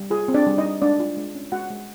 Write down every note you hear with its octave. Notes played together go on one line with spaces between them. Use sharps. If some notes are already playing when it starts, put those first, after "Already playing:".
Already playing: G3
F4 G#4
C4
D4 D5
G3
D#4 D#5
G3
G#3 D4 D5
F4
G#3
C#4
G#3 F#4 F#5
G#3